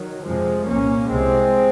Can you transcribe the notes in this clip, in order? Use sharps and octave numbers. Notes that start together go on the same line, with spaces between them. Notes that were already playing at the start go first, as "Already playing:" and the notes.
Already playing: D#3 F#3
F2 C3 F3 G#3
C2 A#2 A#3 C#4
C2 C3 G#3 C4